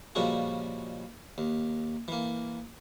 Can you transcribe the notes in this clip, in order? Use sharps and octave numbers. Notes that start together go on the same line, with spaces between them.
A#2 C#3 F3 G3 G#3 F#4
D#2
E3 A#3